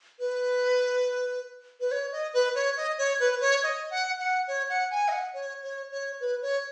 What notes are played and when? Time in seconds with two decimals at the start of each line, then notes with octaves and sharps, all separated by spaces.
0.19 B4
1.80 B4
1.91 C#5
2.12 D#5
2.34 B4
2.55 C#5
2.77 D#5
2.98 C#5
3.20 B4
3.41 C#5
3.63 D#5
3.91 F#5
4.19 F#5
4.48 C#5
4.69 F#5
4.91 G#5
5.08 D#5
5.12 F#5
5.34 C#5
5.63 C#5
5.92 C#5
6.21 B4
6.42 C#5